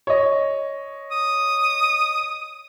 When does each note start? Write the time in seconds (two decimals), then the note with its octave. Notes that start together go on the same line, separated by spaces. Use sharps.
0.07 C#5 D#5
1.11 D#6